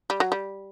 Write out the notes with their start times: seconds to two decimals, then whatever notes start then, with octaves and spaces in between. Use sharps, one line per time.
0.10 G3
0.20 F#3
0.32 G3